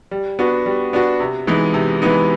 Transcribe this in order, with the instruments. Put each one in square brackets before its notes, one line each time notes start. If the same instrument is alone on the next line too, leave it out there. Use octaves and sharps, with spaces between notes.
[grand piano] G3
B3 D4 F#4
G3
B3 D4 F#4
C3
E3 G#3 B3 D#4
C3
E3 G#3 B3 D#4